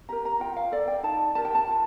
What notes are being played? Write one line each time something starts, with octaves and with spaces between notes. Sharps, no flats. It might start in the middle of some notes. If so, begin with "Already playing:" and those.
G4 A#4 A#5
A#5
F4 G5
F5
A4 D5
G5
D#4 A5
G4 A#4 A5
G5
A5
F4